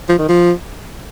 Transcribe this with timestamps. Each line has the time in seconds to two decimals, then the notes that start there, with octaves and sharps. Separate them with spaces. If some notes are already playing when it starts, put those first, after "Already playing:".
0.09 F3
0.18 D#3
0.29 F3